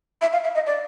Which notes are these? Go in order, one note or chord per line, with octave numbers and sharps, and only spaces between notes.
E5
F5
E5
D#5
D5